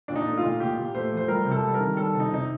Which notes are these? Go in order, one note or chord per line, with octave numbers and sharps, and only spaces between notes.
A#2 D4
D#4
A3
F4
A#2
A#2 G4
A#2
A3 C5
F3
C5
G3 A#4
C3
A4
G3
A#4
D#3
G3 A4
C3
D#4
C3 D#4